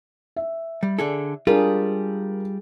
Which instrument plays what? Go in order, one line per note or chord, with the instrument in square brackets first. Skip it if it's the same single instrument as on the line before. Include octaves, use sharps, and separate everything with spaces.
[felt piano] E5
[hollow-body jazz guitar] G3
D3 G#4 A4
[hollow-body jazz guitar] G3 F4 [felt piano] D4 A#4 [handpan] G#4